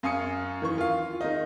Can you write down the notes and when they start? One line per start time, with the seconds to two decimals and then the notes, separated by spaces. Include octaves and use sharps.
0.03 F#2 F5 G#5 D#6 C#7
0.62 D#3 E3 C#6
0.78 F4 F5
1.21 D#3 D#4